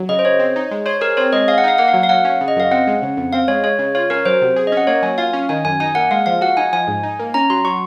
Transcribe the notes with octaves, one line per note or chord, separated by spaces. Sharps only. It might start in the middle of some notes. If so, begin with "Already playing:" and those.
Already playing: F#3
C#3 D#5
C5
C#3 C#5
C4
D#4
G#3
C5 C#5
G#4 A#4
C4 C#5
G#3 D#5
G#4 F5
F#5
D#4 F5
A#3 F#5
F5
F#3
F5
F#3 F#5
C#4
C#3
D#5
F#2 F5
C4 F#5
G#3
C#3
F2
C4 F5
G#3 C#5
G#3 C#5
C#3
F4 C#5
C#4 A#4
F#3 C5
C3
G#4
C#4 D#5
F#5
A#3 C#5
F#3 G#5
F4 F5
C#4
D#3 G#5
F#2 G#5
D#4 G#5
A#3 F#5
G#3 F5
F3 F5
F#4 F#5
D#4 G#5
F3 G#5
G#2
D#4
A#3
C#4 A#5
F#3 C6
F#3 C#6